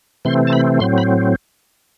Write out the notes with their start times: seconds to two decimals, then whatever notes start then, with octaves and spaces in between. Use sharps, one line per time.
0.25 C3 E3 A3 C4 C6
0.47 A5
0.53 B5
0.80 A2 F#3 C4 C6
0.98 B5